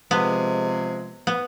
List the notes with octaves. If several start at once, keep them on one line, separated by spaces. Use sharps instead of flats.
C3 F3 G#3 B3
B3